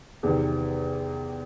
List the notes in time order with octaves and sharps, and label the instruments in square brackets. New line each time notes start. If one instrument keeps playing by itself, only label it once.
[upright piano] E2 C3 D#3